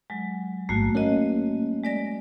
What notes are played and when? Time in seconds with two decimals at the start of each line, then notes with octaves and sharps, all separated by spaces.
0.10 F#3 G#3
0.69 A1 G#2 A3 A#3 F#4
0.95 A#3 C#4 F#4 D#5
1.83 G#3 D5 A#6